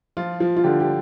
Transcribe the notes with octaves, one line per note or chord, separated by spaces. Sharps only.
F3 F4
F3
F4
D3 G4
G4